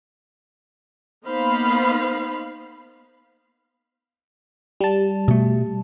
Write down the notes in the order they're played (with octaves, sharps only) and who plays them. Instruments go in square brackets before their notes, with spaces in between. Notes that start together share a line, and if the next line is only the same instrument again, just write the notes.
[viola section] A#3 B3 D#4 C5 F5 B5
[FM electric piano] G3 A5
[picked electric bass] B2 A3